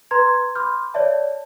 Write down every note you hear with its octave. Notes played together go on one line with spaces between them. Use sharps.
B4 A#5 C6 G#6
B5 C6 D6 F6 G6
C#5 D5 E5 A5